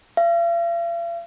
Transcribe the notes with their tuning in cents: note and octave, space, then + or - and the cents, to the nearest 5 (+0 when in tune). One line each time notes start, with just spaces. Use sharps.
F5 -45